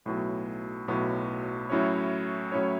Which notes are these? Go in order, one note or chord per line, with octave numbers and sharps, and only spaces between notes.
B1 A2 F#3 B3
B1 A2 F#3 B3
A2 F#3 C#4 E4 C#5
A2 F#3 C#4 E4 C#5